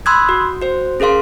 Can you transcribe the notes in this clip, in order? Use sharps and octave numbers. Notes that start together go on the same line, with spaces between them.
B5 C6 D#6 E6 F#6 G#6
F#4
F#4 C5
C#4 G#4 A#4 F5 C6